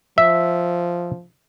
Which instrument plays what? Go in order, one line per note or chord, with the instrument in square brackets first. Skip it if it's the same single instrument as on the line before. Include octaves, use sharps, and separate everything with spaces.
[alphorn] F3 [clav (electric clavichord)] E5